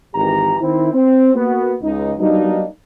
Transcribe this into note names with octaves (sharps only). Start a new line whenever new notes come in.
G#1 E3 G4 A#5
D#3 C4 E4
C4
A#3 B3 F#4
C#2 D#4
F#3 G3 A#3 B3 D4 D#4